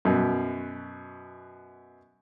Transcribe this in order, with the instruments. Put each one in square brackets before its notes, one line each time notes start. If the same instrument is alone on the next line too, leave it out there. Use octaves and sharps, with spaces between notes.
[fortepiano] F#2 B2